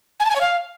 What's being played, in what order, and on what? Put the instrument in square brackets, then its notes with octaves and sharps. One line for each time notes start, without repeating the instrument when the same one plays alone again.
[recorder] G#5
A5
G#5
C#5
F5